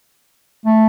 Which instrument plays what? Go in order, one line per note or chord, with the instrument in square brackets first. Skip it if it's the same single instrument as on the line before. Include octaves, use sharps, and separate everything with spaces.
[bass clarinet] A3